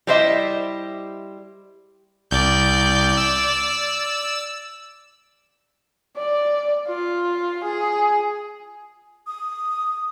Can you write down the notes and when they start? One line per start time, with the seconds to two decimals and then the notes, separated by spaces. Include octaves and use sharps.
0.07 G3 E4 G4 C5 D#5 E5
2.31 C2 D5 G6
3.17 E6
6.17 D5
6.88 F4
7.64 G#4
9.27 D#6